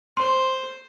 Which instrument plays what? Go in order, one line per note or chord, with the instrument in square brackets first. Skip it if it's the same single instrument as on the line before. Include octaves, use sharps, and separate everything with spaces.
[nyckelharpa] C5 [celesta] C6